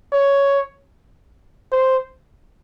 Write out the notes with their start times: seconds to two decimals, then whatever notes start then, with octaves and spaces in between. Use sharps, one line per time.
0.12 C#5
1.72 C5